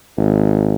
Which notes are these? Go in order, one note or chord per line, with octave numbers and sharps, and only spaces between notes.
G#1